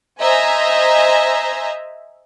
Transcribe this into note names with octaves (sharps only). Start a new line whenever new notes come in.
C5 D#5 E5 G#5 A#5